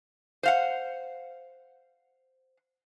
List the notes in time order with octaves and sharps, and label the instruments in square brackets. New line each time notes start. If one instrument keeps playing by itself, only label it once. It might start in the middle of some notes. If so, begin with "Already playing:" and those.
[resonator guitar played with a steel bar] C5 F5 F#5